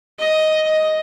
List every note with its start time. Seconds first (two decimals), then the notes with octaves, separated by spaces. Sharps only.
0.19 D#5
0.67 D#5